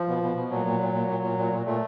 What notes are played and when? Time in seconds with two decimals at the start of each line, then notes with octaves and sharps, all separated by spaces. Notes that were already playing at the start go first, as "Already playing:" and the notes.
Already playing: F3
0.08 B2
0.23 B2
0.36 B2
0.51 A#2 F#3
0.66 A#2
0.81 A#2
0.94 A#2
1.09 A#2
1.24 A#2
1.38 A#2
1.53 A#2
1.66 A#2 A3